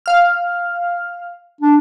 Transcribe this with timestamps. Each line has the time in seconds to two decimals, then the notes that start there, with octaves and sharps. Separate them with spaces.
0.06 F5 F6
1.61 D4